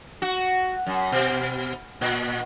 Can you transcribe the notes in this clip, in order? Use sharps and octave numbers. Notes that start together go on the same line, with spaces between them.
F#4
F#2
B2
A#2